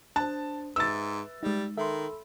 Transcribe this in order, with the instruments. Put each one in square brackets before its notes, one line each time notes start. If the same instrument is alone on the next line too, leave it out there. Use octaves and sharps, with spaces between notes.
[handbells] D4 C5 [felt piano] A5 [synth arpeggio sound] F#6
[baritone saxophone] G#2 [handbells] B4 E5 [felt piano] E6 A6
[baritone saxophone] G3 [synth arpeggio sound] G#3 D#4
[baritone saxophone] D#3 [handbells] A4 B5 [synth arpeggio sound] E5 C6